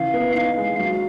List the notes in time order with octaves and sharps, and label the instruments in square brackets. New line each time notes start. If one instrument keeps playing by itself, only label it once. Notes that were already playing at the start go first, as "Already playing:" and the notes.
Already playing: [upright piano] C#3 E3 [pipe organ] F5
[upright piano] B3
[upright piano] D#4 [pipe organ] F5
[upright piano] G#3
F#3